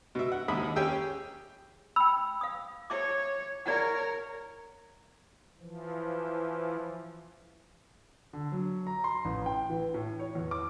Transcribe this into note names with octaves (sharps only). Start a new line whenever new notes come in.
B2 E5
F#5
D#2 G#3 E5 B5 D#6
C#4 G4 G#4 G5 E6
G5 B5 E6 F7
F5 D#6
C#5 E5 D6
A#4 C#5 D5 F#5
E3 F3
D3
F#3
A#5
C6
A1
G5
E3
A2
C#5
E2
D6